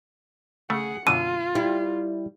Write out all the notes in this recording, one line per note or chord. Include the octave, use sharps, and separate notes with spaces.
C#3 A3 G#4 F#5
F#2 B2 D3 F4 D#7
G3 E4